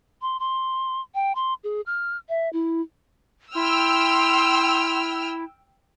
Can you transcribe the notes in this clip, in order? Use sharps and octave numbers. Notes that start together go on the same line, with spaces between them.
C6
C6
G5
C6
G#4
F6
E5
E4
E4 G5 C6 E6 F6